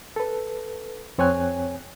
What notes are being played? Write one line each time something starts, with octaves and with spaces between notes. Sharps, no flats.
A4 B4
F2 C4 C#5 G5 G#5 F#6